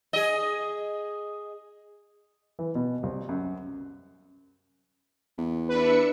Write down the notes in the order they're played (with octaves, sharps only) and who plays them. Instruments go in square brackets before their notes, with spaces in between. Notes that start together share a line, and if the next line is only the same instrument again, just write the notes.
[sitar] G#4 D#5
[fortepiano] E3
B2
C2
F#2
[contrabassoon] E2
[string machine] D4 E5 C#7 [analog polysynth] B4